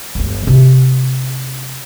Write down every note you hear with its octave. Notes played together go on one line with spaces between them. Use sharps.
G1 E2
C3 D#4